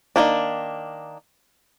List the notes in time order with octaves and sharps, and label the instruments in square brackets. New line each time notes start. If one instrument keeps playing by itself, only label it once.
[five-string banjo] D#3 F#3 A#3 D4